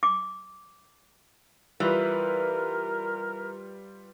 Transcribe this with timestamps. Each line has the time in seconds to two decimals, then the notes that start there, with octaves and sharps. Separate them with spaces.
0.03 D6
1.80 E3 G3 F4 A#4 B4